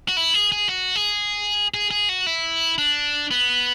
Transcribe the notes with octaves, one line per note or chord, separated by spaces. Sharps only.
F#4
E4
G#4
G#4
F#4
G#4
G#4
G#4
F#4
E4
D4
B3